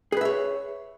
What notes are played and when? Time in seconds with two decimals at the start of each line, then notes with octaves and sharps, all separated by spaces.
0.12 G#4
0.17 B4
0.21 E5
0.25 C#5